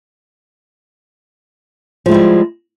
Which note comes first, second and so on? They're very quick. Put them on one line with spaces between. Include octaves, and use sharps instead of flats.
F3 G#3 E4 G3